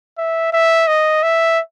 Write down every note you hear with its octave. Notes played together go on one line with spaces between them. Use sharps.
E5
E5
D#5
E5